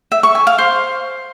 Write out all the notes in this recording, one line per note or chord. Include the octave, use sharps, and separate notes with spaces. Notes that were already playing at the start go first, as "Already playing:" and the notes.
E5
C#6
G#5
F5
C5